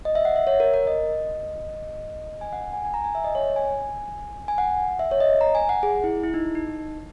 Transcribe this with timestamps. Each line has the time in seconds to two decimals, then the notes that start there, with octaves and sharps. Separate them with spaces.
0.05 D#5
0.15 E5
0.25 F#5
0.36 E5
0.47 C#5
0.60 A#4
0.74 A#4
0.87 D#5
2.41 G#5
2.53 F#5
2.73 G#5
2.85 G#5
2.94 A#5
3.04 G#5
3.15 E5
3.24 D#5
3.35 C#5
3.56 G#5
4.48 G#5
4.58 F#5
4.99 E5
5.11 C#5
5.20 D#5
5.41 A#5
5.55 G#5
5.69 F#5
5.83 G#4
6.04 E4
6.23 E4
6.34 D#4
6.55 D#4